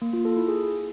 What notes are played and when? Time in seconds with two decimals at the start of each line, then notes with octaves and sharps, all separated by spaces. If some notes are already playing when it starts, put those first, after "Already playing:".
0.02 A#3
0.13 F4
0.25 A4
0.37 E4
0.48 G#4